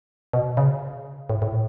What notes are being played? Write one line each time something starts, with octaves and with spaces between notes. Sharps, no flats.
B2
C#3
A2
A2